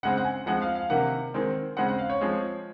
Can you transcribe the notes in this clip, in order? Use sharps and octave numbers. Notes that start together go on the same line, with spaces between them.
C#3 G#3 C4 F#5
F#5
G#5
F3 G#3 C4 F#5
F5
F5
C3 D#3 A#3 F#5
D#3 G#3 C4
C#3 G#3 C4 F#5
F#5
F5
C#5
F3 G#3 C4